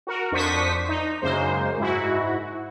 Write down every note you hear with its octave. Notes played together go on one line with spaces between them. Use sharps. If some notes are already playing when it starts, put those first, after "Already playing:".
F#4 A#4
F2 D4 C5 C#6 D#6 B6
D#4
F#2 C#3 G#3 A#3 C5
G#2 E4 F#4